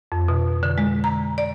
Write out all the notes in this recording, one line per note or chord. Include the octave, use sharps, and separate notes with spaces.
F2
B2
D3
G#3
A#5
D5